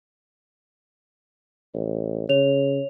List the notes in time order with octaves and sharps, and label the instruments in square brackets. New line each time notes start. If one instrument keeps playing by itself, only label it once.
[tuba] A1
[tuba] C#3 [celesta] C#5 F7